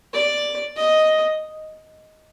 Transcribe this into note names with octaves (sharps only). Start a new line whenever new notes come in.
D5
D#5